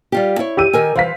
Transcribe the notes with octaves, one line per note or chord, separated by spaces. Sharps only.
G3 F4 G4
E4 C#5
G4 E6 D#7
D#3 A#4 G#5
E3 C5 F5 B6